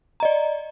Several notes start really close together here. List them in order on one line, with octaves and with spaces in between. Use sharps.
A#5 D#5 D5